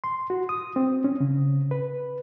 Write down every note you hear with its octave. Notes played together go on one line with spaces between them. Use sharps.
C6
F#4
D#6
C4
C#4
C#3
B4